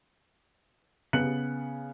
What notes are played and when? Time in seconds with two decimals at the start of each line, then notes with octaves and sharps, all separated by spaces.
1.13 C#3 B3 F#6 C#7 F#7